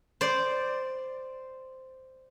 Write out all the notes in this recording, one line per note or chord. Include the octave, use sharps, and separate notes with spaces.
C5 D5